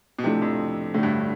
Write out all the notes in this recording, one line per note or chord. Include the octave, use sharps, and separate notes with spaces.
B2
A2 C3 F3 A3 D4 A4
F2
D2 A2 D3 A3 D4
G2